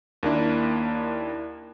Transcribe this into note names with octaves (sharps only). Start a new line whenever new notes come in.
D#2 A#3 D4 E4